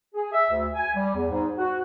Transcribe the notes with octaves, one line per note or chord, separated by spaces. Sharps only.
G#4
E5
D2
G#5
G3
E2
G#2
F#4